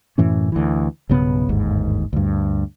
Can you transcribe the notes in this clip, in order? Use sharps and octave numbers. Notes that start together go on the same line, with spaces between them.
F#2 A2 E3 C#4
D2 E3
B1 G2 C#3 B3
G1 D#2 G#2
D2 G2